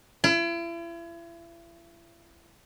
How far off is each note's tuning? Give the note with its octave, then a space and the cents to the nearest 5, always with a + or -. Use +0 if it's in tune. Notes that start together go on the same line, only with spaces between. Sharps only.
E4 +40